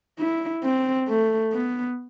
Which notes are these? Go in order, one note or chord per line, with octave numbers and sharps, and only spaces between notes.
E4
C4
A3
B3